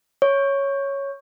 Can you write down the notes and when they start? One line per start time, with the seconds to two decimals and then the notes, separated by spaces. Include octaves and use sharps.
0.22 C#5